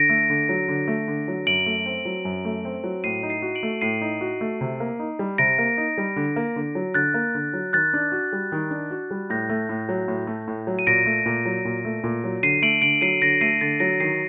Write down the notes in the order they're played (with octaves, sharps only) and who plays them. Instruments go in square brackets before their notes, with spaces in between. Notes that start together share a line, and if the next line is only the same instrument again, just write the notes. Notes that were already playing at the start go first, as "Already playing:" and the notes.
Already playing: [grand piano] D3 [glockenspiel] A#6 D7
[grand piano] A3
D3
F#3
D3
A3
D3
F#3
[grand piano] F#2 [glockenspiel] D7 F#7
[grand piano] A3
C4
F#3
F#2
A3
C4
F#3
[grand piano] A2 [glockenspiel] C7 D#7
[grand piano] D#4
[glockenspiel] C7 D#7
[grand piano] F#4
[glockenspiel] D7 F#7
[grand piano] A3
[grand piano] A2 [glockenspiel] C7 D#7
[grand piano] D#4
F#4
A3
C3
A#3
D#4
G3
[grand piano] C3 [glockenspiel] A#6 D7
[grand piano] A#3
D#4
G3
D3
A#3
D3
F#3
[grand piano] D3 [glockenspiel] F#6 A6
[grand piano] A#3
D3
F#3
[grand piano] D#3 [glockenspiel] F#6 A6
[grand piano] D4
F#4
G3
D#3
D4
F#4
G3
[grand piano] A2 [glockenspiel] G6 A#6
[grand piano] A3
A2
F#3
A2
A3
A2
F#3
[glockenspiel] D#7
[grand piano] A#2 [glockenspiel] A#6 D7
[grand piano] A3
A#2
F#3
A#2
A3
A#2
F#3
[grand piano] D3 [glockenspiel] C7 D#7
[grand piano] A3 [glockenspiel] D7 F#7
[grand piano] D3 [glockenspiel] D7 F#7
[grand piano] F#3 [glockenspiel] C7 D#7
[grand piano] D3 [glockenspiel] A#6 D7
[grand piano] A3 [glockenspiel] C7 D#7
[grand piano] D3 [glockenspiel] A6 C7
[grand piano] F#3 [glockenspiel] A#6 D7
[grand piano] D#3 [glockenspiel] C7 D#7